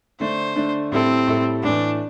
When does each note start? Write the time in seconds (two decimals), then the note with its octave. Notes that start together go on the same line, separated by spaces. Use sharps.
0.20 D3 A3 D4 C5
0.56 D3 A3 D4
0.92 A2 G3 C4 E4 A4
1.27 A2 G3 E4 A4
1.63 A2 E3 A3 D4